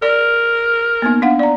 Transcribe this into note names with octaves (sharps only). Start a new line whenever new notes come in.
A#4 D5
A#3 B3 D#4
D4 F5 F#5
D5 A#5